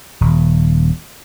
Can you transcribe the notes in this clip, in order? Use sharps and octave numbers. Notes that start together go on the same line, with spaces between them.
D#1